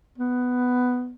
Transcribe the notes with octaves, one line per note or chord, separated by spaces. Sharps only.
B3